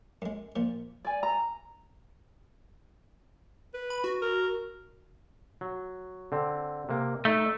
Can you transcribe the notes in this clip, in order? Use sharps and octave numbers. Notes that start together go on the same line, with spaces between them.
F#2 G#3
A#2 F3
D5 G#5
A#5
B4
B5
F#4
A#4
F#3
D3 C4
C3 A#3
A3 D#4 E5